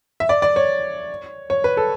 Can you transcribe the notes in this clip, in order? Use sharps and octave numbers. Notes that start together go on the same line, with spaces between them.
E5
D5
D5
C#5
C#5
B4
A4